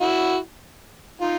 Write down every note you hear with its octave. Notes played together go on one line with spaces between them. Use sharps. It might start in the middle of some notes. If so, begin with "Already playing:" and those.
E4 F#4
D#4 F4